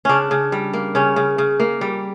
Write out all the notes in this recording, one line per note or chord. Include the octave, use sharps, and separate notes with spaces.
C#3 C#4 D4
C#3
G3
A#3
C#3 C#4
C#3
C#3
A#3
G3